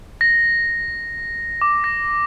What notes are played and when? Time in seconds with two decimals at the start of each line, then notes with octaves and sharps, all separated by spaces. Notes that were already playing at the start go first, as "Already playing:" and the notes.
0.21 A#6
1.62 D6
1.84 A#6